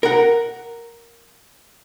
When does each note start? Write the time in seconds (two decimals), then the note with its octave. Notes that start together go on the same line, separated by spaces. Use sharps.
0.03 A#4 F#5